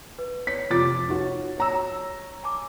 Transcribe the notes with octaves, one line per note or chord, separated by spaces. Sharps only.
B4
C#5 B6
F1 F4 D6 A6
D#4 F#4 C#5
C#5 A#5 E6
G#5 A5 D6